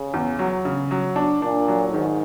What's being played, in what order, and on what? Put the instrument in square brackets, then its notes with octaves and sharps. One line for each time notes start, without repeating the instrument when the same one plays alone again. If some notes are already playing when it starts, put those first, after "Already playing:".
Already playing: [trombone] C#3
[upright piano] E2
F#3
C#3
F#3
D4
[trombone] A#2 [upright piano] D4
[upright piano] F#3
[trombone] G#2 [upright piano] D#3